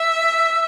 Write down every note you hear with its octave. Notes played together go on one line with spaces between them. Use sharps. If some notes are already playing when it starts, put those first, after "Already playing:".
Already playing: E5